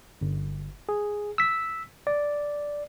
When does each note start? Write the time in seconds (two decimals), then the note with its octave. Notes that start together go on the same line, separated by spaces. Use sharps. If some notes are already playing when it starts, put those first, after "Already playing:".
0.21 G1
0.89 G#4
1.38 E6 B6
2.07 D5